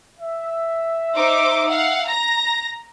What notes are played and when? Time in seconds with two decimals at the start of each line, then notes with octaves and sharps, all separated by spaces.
0.19 E5
1.15 D#4 C5 D6
1.68 F5 F#5
2.06 A#5 A#6